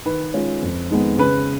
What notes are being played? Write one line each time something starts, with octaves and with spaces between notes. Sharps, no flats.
D#3 B4
G#3 C#4 F4
F2
D#3 G#3 B3
C#3 B4